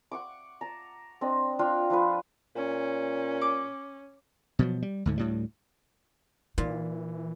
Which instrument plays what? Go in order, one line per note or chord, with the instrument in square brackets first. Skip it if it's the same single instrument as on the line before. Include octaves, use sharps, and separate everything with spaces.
[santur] F#5 C#6 D6
A5 A#5
C4 D4 D#5
D4 F4 F5 G5
F3 F4 B4
[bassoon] A#2 [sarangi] C#4
[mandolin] D6
[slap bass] B2 F3 F#3
G3
D2 G#2 D3
D2 A2 G3
[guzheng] A#2 [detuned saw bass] E3 [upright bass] D#4